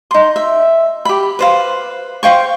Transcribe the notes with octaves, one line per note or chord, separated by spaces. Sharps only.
D#4 C6
E5
G4 B5
B4 C5 F5
C5 F5 G5 C#6